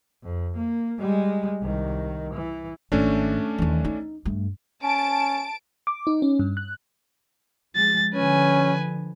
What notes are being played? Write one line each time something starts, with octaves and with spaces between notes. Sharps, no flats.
F2
A#3
G3 G#3
C2 D#3
E3
G#1 A3 C#4 D4
D#2 E3
D#4
G2 A3
C#4 A5 D7
D6
D#4
C#4
G2
F#6
F3 G#3 A6
D3 F3 C#4 B4 G#5